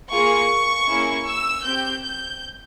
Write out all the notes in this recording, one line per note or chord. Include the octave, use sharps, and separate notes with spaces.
A#3 F4 G#4 C#6
A#3 C#4 E4 G#4
E6
C4 G4 G6
G6